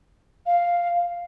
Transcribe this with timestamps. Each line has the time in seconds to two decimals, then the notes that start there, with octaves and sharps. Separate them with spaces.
0.46 F5